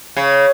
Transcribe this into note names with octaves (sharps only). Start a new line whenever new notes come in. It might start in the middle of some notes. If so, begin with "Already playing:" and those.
C#3